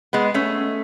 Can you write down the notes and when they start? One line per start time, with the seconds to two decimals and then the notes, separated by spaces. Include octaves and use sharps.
0.13 G#3 B3
0.34 A3 C#4